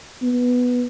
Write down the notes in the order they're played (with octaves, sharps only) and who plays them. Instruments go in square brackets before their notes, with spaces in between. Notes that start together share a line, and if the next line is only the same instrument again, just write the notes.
[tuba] B3